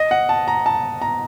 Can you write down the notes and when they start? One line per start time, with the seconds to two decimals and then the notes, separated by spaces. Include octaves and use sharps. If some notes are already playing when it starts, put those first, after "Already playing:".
Already playing: D#5
0.11 F#5
0.29 A5
0.48 A#5
0.66 A5
1.02 A#5